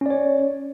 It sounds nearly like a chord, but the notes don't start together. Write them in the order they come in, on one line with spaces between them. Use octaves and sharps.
C#4 D5 C#5